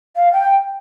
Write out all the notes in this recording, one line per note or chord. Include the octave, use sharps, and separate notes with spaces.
F5
G5